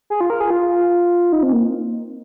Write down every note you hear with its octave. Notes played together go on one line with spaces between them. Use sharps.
G#4
F4
A#4
G#4
F4
D#4
C4
A#3